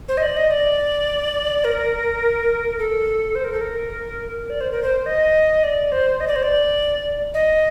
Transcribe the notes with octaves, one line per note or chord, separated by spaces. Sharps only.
C5
D#5
D5
D#5
D5
A#4
A4
C5
A#4
A4
A#4
D5
C5
A#4
C5
D#5
D5
C5
D#5
D5
C5
D5
D#5